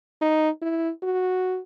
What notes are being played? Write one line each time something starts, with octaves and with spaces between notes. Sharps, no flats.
D#4
E4
F#4